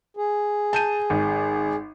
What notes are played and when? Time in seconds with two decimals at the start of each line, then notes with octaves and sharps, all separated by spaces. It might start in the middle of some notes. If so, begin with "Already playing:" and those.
0.17 G#4
0.73 A5 G6 D#7
1.10 G#1